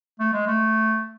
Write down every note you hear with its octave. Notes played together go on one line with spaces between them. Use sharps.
A3
G#3
A3